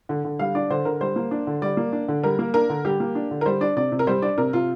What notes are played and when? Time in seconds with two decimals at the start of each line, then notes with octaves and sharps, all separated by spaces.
0.09 D3
0.24 D3
0.39 G3 F5
0.55 D4 D5
0.70 D3 C5
0.85 D3 A#4
1.01 G3 C5
1.16 A#3
1.31 D4
1.47 D3
1.62 G3 D5
1.77 A#3
1.92 D4
2.08 D3
2.23 G3 A#4
2.39 A#3
2.54 D4 A#4
2.69 D3
2.85 G3 G4
3.00 A#3
3.15 D4
3.31 D3
3.41 A#4
3.46 G3 C5
3.61 D4 D5
3.76 C3 D5
3.92 C3
3.99 A#4
4.07 G3 C5
4.22 D4 D5
4.38 C3 A#4
4.53 C3 F4